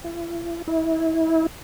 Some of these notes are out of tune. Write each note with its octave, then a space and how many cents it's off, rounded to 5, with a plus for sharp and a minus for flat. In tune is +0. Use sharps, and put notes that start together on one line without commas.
E4 +45
E4 -30